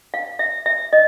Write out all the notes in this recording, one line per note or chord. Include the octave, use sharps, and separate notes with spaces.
F5
E5
E5
D#5